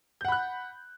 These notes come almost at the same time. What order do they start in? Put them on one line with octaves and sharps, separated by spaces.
G6 F#5 B5 F#6